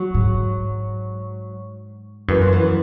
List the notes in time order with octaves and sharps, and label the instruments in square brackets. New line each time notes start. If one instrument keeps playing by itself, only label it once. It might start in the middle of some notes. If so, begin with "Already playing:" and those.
Already playing: [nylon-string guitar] F#3
[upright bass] G#2
[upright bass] F#2 [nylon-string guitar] E3
[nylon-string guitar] F3
E3